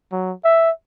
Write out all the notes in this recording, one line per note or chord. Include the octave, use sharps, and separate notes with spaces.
F#3
E5